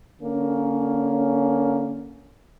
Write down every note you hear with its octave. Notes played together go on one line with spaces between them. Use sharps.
D3 A#3 C#4